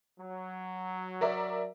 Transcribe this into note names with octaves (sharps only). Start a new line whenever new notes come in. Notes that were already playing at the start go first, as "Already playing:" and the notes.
F#3
A#4 D5 E5